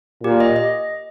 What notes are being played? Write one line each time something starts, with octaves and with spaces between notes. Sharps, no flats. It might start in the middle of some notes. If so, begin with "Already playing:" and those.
A#2 G4
D#5
D#5